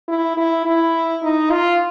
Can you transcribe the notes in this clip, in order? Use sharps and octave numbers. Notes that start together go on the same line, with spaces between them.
E4
E4
E4
D#4
F4